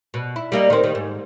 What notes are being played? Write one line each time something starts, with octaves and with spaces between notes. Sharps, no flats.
B2
E4
G3 A#3 D#4
D#3 C4
D#3
G#2